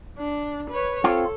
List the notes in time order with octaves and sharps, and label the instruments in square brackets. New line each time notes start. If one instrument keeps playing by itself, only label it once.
[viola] D4
B4 C#5
[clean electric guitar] C4 F4 [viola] A4